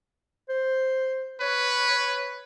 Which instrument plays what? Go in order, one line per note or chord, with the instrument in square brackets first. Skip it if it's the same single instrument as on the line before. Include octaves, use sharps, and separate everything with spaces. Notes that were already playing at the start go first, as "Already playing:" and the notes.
[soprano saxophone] C5
[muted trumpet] B4 [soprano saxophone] C#5